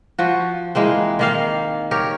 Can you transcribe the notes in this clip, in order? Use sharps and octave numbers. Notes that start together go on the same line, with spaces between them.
F3 F#4
E3 G#3 A#3 C4
D#3 A#3 F5
G4 A#4 C#5